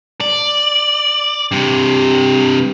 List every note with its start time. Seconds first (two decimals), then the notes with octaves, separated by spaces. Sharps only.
0.21 D5
1.52 G2 C3